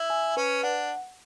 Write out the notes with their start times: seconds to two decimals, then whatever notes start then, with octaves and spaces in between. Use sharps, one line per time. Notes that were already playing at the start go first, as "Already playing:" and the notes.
Already playing: E4
0.10 G#5
0.37 C#4 B4
0.63 D4 F#5